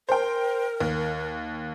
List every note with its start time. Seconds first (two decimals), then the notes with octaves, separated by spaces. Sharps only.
0.09 A#4 C5 G5
0.80 D#2